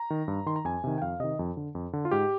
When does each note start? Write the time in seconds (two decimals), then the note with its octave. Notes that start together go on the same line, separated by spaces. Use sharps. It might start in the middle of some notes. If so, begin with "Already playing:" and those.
Already playing: A#5
0.10 D#3
0.28 G2
0.46 D#3 C6
0.56 A#5
0.65 F2 G#5
0.84 C3 D#3
0.98 G5
1.02 F2 F5
1.20 C3 D#3 D#5
1.39 F2
1.57 D3
1.75 F2
1.93 D3
2.05 F4
2.11 G#2 G4